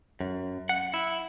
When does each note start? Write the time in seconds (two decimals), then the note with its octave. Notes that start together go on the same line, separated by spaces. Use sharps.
0.20 F#2
0.69 F#5
0.94 E4